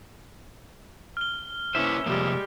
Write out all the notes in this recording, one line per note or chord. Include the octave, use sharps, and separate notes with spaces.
F6 G7
A#3 C#4 E4 B4 C5 E5
C3 F3 G3 G#3 A#3